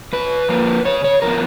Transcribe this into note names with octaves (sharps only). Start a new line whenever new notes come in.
C#3 B4
F3 A#3
C#3 C#5
C#5
F3 B3 A#4